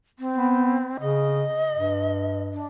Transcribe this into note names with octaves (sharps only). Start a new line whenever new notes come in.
C4
B3
C#3 D#5
G2
D4